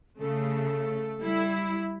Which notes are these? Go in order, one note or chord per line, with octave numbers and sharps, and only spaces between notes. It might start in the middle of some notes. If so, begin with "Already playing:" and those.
C#3 A3 A4
G3 E4